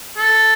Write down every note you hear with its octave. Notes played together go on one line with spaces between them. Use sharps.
A4